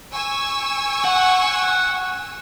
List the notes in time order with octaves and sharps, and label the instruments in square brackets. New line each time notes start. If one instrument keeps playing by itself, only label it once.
[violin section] G#5 C#6 E6
[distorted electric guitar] F#5